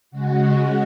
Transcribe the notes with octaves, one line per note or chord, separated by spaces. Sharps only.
C#3 G#3 F#4